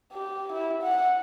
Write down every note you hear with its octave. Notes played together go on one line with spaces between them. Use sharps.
G4
E4
F#5